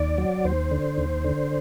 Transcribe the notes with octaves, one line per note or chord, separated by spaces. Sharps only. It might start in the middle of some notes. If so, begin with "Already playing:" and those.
Already playing: D#2 D5
F#3
D#2 C5
D3
D#2
D3